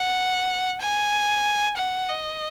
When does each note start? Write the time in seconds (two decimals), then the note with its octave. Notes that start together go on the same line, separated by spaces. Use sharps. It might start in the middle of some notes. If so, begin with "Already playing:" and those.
Already playing: F#5
0.81 G#5
1.77 F#5
2.10 D#5